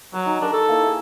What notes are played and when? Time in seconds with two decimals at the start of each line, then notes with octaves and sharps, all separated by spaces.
0.14 F#3 A#5
0.26 D#4 G#5
0.41 D4 G4 A4 A#4
0.53 A4 C#6
0.69 A#3 E4
0.83 G#4 E5